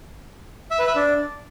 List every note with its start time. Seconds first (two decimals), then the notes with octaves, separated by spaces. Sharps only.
0.71 E5
0.79 B4
0.87 E5
0.95 D4